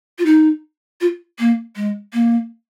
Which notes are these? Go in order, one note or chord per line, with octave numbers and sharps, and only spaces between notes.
F4
D#4
F4
A#3
G#3
A#3